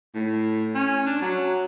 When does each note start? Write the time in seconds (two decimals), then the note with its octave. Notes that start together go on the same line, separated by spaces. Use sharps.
0.14 A2
0.75 C#4
1.06 D4
1.22 F#3